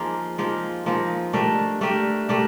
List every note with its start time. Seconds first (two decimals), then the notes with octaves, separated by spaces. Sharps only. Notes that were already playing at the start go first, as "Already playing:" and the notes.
Already playing: F3 A#3 D#4 G#4
0.38 F3 A#3 D#4 G#4
0.86 F3 A#3 D#4 G#4
1.33 A3 D4 G4 A#4
1.81 A3 D4 G4 A#4
2.29 A3 D4 G4 A#4